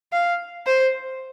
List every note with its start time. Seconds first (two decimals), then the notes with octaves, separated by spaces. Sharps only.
0.13 F5
0.66 C5